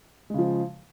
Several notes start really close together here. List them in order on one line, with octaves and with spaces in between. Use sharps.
G#3 C#3 F3